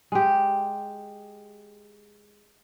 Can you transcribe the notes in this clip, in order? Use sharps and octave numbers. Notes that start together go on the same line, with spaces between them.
G#3 G4